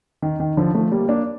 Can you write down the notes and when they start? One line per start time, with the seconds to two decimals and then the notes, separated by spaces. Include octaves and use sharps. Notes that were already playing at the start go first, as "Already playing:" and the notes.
0.22 D#3
0.40 D#3
0.57 D3 F3
0.75 F3 A3
0.92 G3 A#3
1.08 A#3 D4